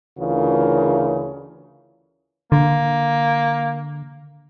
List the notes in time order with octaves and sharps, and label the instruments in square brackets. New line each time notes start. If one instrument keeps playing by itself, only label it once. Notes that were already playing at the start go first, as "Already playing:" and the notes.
[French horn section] D2 C#3 E3 F4 A#4
[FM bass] D3 [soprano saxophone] A#3